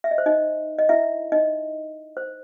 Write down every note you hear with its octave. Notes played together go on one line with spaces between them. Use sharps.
E5
D#5
C5
D#4 D#5
D#5
E4 E5
D#4 D#5
C5